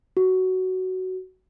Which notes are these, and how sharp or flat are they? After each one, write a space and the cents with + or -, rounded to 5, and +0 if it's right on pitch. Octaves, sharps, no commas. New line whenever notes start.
F#4 +10